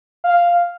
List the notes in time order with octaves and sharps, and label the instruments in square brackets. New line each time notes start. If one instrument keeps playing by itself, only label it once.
[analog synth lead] F5